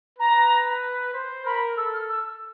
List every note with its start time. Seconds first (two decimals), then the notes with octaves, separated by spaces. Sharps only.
0.19 B4 A#5
1.14 C5
1.45 A#4 B5
1.77 A4 E6
1.93 F6
2.10 E6